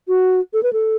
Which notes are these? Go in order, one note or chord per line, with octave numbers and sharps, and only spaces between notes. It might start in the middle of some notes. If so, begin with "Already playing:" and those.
F#4
A4
B4
A4